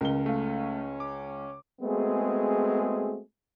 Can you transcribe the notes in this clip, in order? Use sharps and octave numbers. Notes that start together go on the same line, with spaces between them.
C#2 C#4 A#4 G7
A3 F5
D6
G#3 A3 B3 C4 F#4 G#4